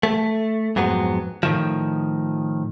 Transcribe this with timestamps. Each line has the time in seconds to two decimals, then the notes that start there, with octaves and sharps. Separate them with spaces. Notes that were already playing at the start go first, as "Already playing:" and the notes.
0.03 A3
0.76 F2 G#2 F#3 B3
1.43 A2 D#3 F3